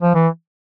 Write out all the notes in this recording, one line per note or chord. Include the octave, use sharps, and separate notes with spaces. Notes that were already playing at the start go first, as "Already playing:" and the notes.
F3
E3